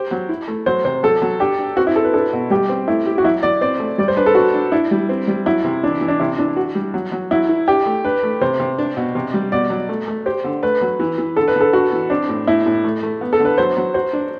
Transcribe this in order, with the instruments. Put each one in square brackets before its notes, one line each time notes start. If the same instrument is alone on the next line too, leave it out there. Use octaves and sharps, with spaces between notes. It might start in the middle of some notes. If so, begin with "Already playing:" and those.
Already playing: [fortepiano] G4 [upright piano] C5
[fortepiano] F#3
E4
A3
[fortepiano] F#3 [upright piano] C5
[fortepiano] C3 [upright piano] C5
[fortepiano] F#3 [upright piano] A4
[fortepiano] F#3
[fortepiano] D4 [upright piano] G4
[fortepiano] D4
[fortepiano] C4 [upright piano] F#4
[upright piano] E4
[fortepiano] C4 [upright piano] A4
[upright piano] B4
[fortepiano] D4 [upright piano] A4
[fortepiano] B2
[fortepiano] G3 [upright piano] G4
[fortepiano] C4
[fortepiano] A3 [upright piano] E4
[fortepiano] G4
[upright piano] F#4
[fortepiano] F#3 [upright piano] E4
[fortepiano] F#3 [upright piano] D5
[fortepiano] C4 [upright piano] D5
[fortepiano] A3
[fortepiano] G3 [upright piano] D5
[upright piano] C5
[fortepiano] D4 [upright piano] B4
[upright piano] A4
[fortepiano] D4 [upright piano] F#4
[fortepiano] D4
[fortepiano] D4 [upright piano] E4
[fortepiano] G3
C4
G3
[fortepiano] F#3 [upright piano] E4
[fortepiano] C3
[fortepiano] E3 [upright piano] D4
[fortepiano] E3
[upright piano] D4
[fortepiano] C3 [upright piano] E4
[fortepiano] E3 [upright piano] D4
[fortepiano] F#4
G3
F#3
F#3
[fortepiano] F#3 [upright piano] E4
[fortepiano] E4
[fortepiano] D4 [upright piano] G4
[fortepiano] A3
[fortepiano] D4 [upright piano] B4
[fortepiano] A3
[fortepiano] C3 [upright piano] C5
[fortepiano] C3
D4
B2
C3
G3
[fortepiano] B2 [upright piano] D5
[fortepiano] F#3
A3
A3
[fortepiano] G4 [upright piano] C5
[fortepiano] D3
[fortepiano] A3 [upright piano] B4
[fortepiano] F#3
E3
E3
[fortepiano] D3 [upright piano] A4
[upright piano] B4
[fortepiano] D3
[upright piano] A4
[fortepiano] D4 [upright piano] F#4
[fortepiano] E3
[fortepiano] C4 [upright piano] D4
[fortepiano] A2
[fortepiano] A2 [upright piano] E4
[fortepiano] A2
A3
A3
B3
[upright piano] A4
[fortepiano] D3
[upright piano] B4
[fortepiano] F#3 [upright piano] C5
[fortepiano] F#3
[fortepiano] F#4 [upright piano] C5
[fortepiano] D4